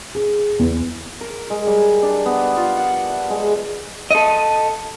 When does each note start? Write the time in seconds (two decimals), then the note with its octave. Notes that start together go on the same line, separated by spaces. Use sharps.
0.15 G#4
0.59 E2
1.21 A#4
1.50 G#3
1.67 G3
2.03 D4
2.26 B3
2.57 F4
2.77 F#5
3.10 E5
3.30 G#3
4.11 A4 D#5